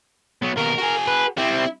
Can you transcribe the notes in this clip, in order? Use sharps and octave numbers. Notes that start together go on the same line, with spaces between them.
F#3 B3
D#2 B2 A#4
F#4 G#4
B4
G3 C4 E4